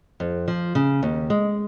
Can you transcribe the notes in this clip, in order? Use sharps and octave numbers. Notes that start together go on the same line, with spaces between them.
F2
F3
C#3
D#2
G#3